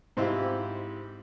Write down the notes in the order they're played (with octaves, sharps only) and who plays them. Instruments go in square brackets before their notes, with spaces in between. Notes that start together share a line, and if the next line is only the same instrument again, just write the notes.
[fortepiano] G#2 C4 E4 F4 G4